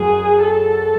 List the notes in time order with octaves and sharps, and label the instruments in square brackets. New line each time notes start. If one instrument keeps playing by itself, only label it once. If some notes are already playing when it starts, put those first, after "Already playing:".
Already playing: [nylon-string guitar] F#2 [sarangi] G#4
[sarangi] A4